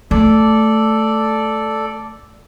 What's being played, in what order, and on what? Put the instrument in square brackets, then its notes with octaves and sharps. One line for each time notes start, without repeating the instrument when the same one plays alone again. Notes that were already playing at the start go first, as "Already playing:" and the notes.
[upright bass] A3 [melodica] A4 D5